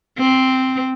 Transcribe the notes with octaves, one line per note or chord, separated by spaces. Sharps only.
C4